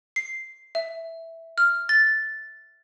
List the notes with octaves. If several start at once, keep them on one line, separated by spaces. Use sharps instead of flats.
C7
E5
F6
A6